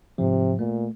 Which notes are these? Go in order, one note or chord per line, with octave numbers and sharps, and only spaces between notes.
G#2 C3 F3
A#2 A3